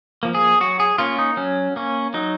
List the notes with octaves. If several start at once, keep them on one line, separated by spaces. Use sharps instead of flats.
F3 A#3
G#4
F#3 F#4
G#4
A#3 C#4 F4
D#4
F#3 C#4
A#3 C#4
F#3 D#4